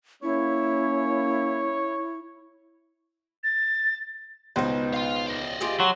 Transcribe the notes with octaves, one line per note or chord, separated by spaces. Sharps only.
A#3 C#4 E4 C#5
A6
C#2 B2 D#4 B4 C5
F5 C6
D5 D#5
F4 G4 G#4
F#3 C6